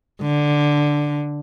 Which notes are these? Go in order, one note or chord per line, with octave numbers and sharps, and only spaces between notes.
D3